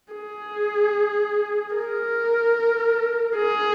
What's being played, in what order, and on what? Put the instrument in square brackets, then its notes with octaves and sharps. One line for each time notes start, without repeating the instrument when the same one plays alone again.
[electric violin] G#4
A#4
G#4